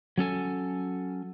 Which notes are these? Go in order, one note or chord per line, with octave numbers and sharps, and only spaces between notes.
F#3 C#4 A4 G#5